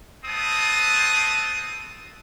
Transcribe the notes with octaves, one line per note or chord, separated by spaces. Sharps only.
A3 B3 C4 A5 D#6